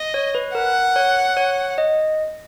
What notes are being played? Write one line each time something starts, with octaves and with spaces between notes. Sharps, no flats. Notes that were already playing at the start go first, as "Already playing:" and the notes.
Already playing: D#5
C#5
B4
A#4 F#5
C#5
C#5
D#5